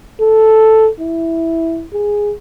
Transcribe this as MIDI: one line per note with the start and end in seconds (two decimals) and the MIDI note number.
0.21 0.89 69
1.00 1.85 64
1.93 2.33 68